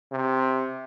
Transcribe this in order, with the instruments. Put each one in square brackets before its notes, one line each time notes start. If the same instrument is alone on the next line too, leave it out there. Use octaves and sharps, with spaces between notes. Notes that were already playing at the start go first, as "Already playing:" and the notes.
[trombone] C3